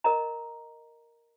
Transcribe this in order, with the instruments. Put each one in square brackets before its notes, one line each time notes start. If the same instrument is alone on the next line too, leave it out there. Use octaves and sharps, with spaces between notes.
[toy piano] A#4 D#5 A#5